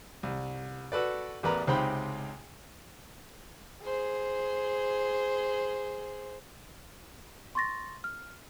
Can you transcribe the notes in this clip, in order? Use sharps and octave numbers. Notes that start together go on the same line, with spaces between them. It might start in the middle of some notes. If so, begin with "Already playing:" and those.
C2
F#4 A4 B4 D5
A1 E2 A#4 B4 D5 A#5
C#2 C3 D#4 C5 G5 B5
G#4 C5
C6 C#6 A6 A#6
F6